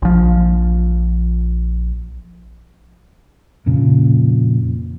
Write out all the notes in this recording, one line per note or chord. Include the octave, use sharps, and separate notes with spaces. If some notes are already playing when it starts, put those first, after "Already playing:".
A#1 F3
F2 A#2 C#3 F3